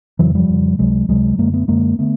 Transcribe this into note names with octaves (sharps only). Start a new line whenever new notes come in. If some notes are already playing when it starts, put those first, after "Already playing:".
F2 C#3 E3 F#3
F3 G3
F2 C#3
C#2 C3 F#3 G#3
C#2 C3 F#3 G#3
F#2 D3 G#3 A#3
A3 B3
F#2 D3 G#3 A#3
D3 A3 B3